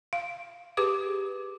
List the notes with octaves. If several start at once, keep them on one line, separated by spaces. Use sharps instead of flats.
F5
G4 G#4 B4 D6